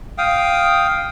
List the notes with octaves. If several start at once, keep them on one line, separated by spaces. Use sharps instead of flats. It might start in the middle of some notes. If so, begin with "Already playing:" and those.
F5 G5 D#6